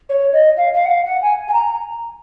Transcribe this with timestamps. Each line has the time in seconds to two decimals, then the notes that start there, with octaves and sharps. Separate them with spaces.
0.09 C#5
0.33 D#5
0.57 F5
0.74 F5
0.85 F#5
0.89 F5
1.06 F#5
1.22 G#5
1.48 G#5
1.53 A#5